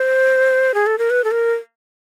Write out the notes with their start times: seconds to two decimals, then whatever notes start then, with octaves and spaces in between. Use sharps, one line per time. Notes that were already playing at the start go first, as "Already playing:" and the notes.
Already playing: C5
0.74 G#4
0.87 A4
0.98 A#4
1.10 B4
1.24 A4
1.31 A#4